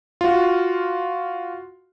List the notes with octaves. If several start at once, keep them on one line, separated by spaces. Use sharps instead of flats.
F4 F#4